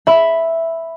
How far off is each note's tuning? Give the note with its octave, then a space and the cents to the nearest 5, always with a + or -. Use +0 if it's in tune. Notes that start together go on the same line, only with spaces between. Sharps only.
E5 +0 B5 +0